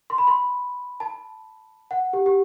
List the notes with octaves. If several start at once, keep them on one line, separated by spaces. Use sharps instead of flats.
C6
B5
C6
A5
F#5
G4
G4